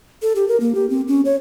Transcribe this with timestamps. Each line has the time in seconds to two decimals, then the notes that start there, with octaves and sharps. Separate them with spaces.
0.22 A4
0.35 G4
0.48 A#4
0.60 A#3
0.75 G4
0.90 C4
1.08 C#4
1.25 C#5